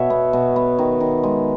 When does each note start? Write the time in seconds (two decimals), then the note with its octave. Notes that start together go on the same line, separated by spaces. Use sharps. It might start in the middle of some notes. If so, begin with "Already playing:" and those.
Already playing: B2 C#5 E5
0.10 B3
0.33 B2
0.56 B3
0.79 D#3
1.00 D#3
1.23 G#3